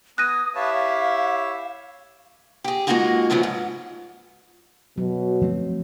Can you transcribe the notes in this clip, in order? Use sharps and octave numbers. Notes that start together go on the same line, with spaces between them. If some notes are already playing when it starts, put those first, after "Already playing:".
B3 G#5 D#6 F#6 A#6 D#7
E4 G4 B4 C#5 E5 F5 A5
C#5
G4 G#4
G#3 A#3 D#4 F4 F#4 G#4
C#3 F3 F#3 A3 B3
G#2
B2 F#3
F3 A3 C4